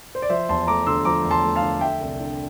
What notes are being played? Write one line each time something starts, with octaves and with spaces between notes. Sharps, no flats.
C5
D5
F3 C5 E5
E2 A5 C6
A3 A#5 D6
D3 C6 E6
F3 A#5 D6
E2
A5 C6
A3
F5 A5
D3
A3 E5 G5
C2
D4